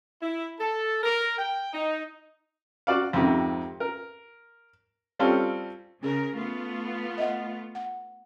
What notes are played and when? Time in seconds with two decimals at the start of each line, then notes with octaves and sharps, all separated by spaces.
0.22 E4
0.59 A4
1.03 A#4
1.38 G5
1.73 D#4
2.87 F#4 D5 F5
3.13 F2 G#2 C3 D#3
3.80 A#4
5.19 G3 C4 C#4 F4 A4
6.03 C#3 C#4 G#4 A#4
6.35 A3 B3 F4
7.18 D#5 E5 F#5
7.75 F#5